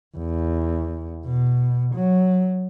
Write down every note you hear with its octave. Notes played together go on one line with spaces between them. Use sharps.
E2
B2
F#3